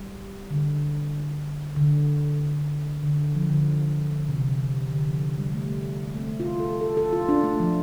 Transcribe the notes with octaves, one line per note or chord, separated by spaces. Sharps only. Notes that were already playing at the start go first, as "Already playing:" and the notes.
Already playing: G3
D3
D3
D3
F3
D3
C3
D3
F3
G3
A3
A3
C4
F4
A4
A4
A4
F4
D4
A3
F3